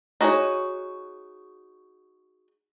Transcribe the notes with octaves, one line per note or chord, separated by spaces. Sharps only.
D#4 F#4 G#4 C5 C#5